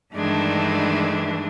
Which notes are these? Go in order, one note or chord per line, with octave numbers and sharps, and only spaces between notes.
G2 D#3 E3 G#3 A3 D4